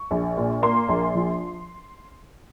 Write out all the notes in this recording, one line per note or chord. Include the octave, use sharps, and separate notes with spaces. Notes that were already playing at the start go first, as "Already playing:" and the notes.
Already playing: C#6
A#1
A#2
A#3 C6
A#1
F3